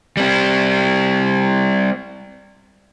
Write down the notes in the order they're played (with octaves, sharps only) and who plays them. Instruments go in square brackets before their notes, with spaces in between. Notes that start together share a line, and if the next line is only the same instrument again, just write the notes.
[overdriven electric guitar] G3 C4